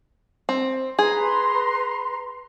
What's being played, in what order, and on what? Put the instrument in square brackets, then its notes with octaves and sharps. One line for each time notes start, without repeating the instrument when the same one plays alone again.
[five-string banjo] C4
[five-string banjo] G#4 [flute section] B4 A#5 C6